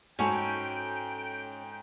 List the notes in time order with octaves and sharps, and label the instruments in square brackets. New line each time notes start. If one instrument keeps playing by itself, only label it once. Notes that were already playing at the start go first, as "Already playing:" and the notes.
[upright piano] G#2 G#5 [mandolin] C#4 [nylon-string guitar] F#4 A4 [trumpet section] G5